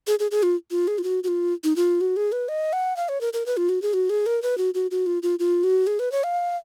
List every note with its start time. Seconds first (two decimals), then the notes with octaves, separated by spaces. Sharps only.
0.07 G#4
0.19 G#4
0.31 G#4
0.43 F4
0.71 F4
0.88 G#4
0.98 F4
1.04 F#4
1.24 F#4
1.28 F4
1.64 D#4
1.76 F4
2.01 F#4
2.16 G#4
2.32 B4
2.49 D#5
2.73 F#5
2.97 F5
3.09 C#5
3.21 A#4
3.33 A#4
3.46 B4
3.57 F4
3.69 F#4
3.82 G#4
3.94 F#4
4.10 G#4
4.26 A#4
4.42 B4
4.58 F#4
4.74 F#4
4.91 F#4
5.06 F4
5.23 F4
5.39 F4
5.64 F#4
5.87 G#4
5.99 B4
6.12 C#5
6.24 F5